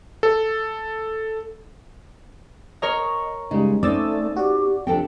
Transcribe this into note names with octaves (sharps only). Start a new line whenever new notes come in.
A4
A#4 C#5 D#5 A#5 C#6
C#3 G3 G#3 D#4
A3 C4 C#4 D#4 D5 E6 A6
F#4 G4 D5
C3 F3 D4 A4 G5